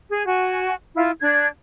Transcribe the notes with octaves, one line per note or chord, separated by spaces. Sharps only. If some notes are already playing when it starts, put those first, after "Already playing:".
G#4
F#4 G#5
E4 F4
D4 G#6